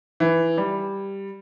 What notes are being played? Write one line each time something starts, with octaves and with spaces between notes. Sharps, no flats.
E3
G3